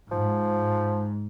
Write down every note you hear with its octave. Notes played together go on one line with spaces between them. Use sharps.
G#2 F3